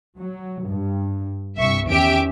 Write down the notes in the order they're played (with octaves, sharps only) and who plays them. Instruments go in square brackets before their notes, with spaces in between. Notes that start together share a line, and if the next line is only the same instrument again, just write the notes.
[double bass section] F#3
G2
[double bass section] C2 G2 [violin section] E5 C#6
[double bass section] E2 D#3 C#4 [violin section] G4 E5 D7